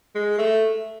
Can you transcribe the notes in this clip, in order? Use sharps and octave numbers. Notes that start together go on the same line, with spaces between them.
G#3
A3